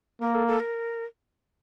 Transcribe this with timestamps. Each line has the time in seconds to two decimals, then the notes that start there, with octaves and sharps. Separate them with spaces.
0.22 A#3 A#4
0.35 A4
0.48 A4
0.60 A#4